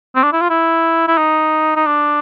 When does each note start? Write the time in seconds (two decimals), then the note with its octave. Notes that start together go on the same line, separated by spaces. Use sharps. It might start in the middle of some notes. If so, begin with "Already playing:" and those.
0.15 C4
0.23 D4
0.32 E4
0.41 F4
0.50 E4
1.08 E4
1.18 D#4
1.76 D#4
1.86 D4